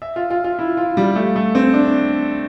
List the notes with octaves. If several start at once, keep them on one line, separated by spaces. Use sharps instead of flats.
E5
F4
F4
F4
E4
F4
G3
A3
A3
C4
D4